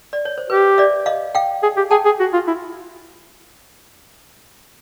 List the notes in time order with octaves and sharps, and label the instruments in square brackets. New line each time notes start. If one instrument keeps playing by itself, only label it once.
[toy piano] D5
C#5
C5
[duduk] G4 [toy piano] B4
[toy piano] D5 E5
D#5 F5
F5 G5
[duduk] G#4
G4
[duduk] G#4 [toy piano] G5 A5
[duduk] G#4
F#4
F4
E4